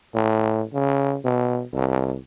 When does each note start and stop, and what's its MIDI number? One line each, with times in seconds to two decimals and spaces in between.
0.14 0.63 45
0.73 1.17 49
1.24 1.63 47
1.73 2.16 36